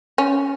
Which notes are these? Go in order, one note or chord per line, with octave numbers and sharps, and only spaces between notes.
C#4